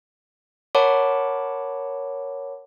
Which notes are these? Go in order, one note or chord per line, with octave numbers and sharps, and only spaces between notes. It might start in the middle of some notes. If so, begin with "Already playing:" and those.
A#4 C#5 F#5 A5 B5 D6